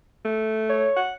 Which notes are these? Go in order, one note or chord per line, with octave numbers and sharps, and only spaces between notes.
A3
C#5
F#5